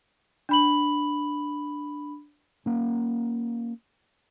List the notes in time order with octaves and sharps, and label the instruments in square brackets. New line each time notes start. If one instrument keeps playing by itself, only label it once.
[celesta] D4 B5 F#7
[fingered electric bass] A#3 C#4